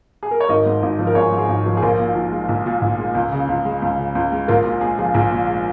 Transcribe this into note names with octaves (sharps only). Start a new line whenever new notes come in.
G#4
A#4
C#5
G#1 A#4 D#5
G#2
G#1
F3
A#4
G#1 G#4 C#5
G#2
G#4
G#1
F3
G#4
A#1 F4 A#4
A#2
A#1
G#3
A#1
A#2
A#1
G#3
C#2
C#3
C#2
G#3
C#2
C#3
C#2
G#3
A#1 F4 A#4
A#2 F4
G#3 G#4
F3 G#4
A#1 G#4
A#2
G#3